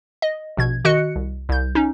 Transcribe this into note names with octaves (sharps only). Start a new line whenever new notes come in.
D#5
A#1 B2 G#6
D#3 F#4 D#5 F#6 C#7
C2
C2 G6
C#4 D#4